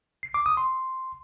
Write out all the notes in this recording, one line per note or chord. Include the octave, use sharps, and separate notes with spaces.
C7
D6
D#6
C6